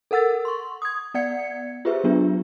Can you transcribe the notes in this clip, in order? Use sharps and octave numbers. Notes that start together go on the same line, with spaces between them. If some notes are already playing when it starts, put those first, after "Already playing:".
A4 A#4 F#5 E6 A6
C6 C#6
D#6 G#6
B3 D5 F#5 G#6 C#7
F4 G4 G#4 B4 C5 E5
F#3 B3 D4 F4